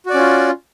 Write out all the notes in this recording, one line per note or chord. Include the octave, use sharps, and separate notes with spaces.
C#4 F4 F#4 D5